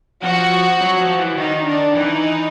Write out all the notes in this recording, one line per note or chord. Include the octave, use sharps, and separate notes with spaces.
F3 F#4
F#3
F3
E3
D#3 D#4
D4
E3 D#4